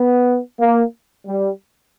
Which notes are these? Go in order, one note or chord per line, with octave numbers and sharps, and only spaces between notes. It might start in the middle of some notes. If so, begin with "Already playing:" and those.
Already playing: B3
A#3
G3